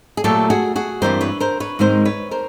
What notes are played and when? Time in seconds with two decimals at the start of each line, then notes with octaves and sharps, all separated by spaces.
0.17 G#4
0.24 A#2 F#3 A3 G4 A4
0.50 F#4 G#4
0.76 F#4 G#4
1.02 G2 E3 G3 C4 A#4 C5
1.21 B4 C#5
1.40 A#4 C5
1.60 B4 C#5
1.79 G#2 D#3 G#3 C4 A#4 C5
2.05 B4 C#5
2.31 A#4 C5